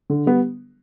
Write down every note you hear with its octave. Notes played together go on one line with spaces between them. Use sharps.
D3
G3 B3